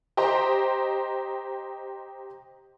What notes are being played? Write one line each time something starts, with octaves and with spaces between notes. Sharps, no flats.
G4 C5 D#5 A#5 C6